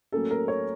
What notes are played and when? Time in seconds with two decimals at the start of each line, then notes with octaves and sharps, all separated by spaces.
0.12 A2 F#3 A#3 C#4 A4
0.31 A#4
0.48 C#5